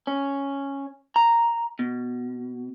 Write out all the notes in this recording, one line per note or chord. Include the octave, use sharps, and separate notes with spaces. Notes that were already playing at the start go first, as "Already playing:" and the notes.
C#4
A#5
B2